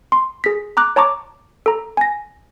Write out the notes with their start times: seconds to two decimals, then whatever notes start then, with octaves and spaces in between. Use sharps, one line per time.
0.12 C6
0.44 G#4 B6
0.77 A#5 D6 F#6
0.96 C#5 A5 A#5 C#6 D6
1.66 A4 A#5
1.97 G#5 A#6